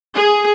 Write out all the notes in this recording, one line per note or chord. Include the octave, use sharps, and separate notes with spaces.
G#4